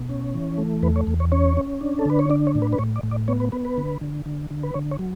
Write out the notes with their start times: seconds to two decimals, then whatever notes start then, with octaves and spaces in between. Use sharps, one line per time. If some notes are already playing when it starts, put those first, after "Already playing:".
Already playing: B2
0.09 C#4
0.34 E3
0.58 A3
0.83 E2 B4
0.96 C#5
1.07 E2
1.20 C#5
1.32 C#4 C#5
1.57 C#4
1.81 D4
1.99 A4
2.05 D3 B4
2.19 C#5
2.30 D4 D5
2.47 C#5
2.55 A2
2.62 B4
2.73 B4
2.78 A2 C#5
2.96 D5
3.03 A2
3.11 D5
3.28 B3 C#5
3.40 B4
3.52 B3 B4
3.65 B4
3.77 D3
4.01 D3
4.26 D3
4.51 D3
4.63 B4
4.74 D3 C#5
4.91 C#5
4.99 F#3